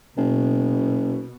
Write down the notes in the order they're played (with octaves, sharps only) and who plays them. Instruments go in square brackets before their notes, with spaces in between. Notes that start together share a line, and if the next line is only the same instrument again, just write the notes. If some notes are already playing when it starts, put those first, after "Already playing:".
[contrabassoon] F#1 [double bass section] B2